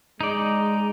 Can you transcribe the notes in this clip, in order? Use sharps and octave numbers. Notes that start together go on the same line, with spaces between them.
G#3 D#4 D5